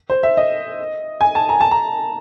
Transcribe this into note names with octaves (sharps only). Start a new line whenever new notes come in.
C5
E5
D#5
G#5
A5
A#5
A5
A#5